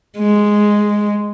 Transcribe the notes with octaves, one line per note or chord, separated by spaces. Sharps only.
G#3